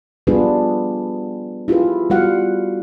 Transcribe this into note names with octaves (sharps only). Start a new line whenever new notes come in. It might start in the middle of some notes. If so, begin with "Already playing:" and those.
G3 B3 D4 F4 G#4 B4
E4 F4 G4 G#4 B4
G3 B3 F4 F#4 F5 F#5